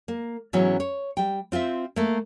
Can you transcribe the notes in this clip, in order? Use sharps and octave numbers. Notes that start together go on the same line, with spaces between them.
A#3
G#2 E3 F#3 G#3 B3 C#4
C#5
G3 G5
C4 F4 C5 E5
A3 A#3